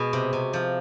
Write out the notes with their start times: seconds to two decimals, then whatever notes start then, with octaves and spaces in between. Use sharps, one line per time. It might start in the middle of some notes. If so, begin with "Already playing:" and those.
Already playing: B2 G#3
0.13 C3
0.33 C3
0.53 F3